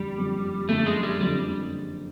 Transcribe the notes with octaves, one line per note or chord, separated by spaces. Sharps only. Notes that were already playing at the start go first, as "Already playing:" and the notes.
Already playing: F#1 F2 D3 G3
F#1 F2 D3
F#1 F2 D3 A3
G#3
G3
F#1 F2 D3 G3